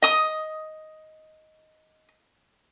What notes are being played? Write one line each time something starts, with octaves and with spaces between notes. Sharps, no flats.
D#5 D#6